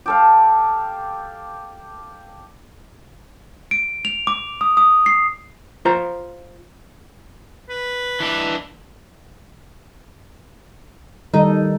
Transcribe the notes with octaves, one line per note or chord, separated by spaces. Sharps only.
G4 A4 F5
D7
F7
D6
D#6
D#6
C7
F4 C5 A#5
B4
E3 D4
D#3 G3 D#4 A4